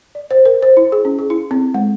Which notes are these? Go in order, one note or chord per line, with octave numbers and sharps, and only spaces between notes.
D5
C5
A#4
C5
E4
G#4
C#4
G#4
E4
C4
G#3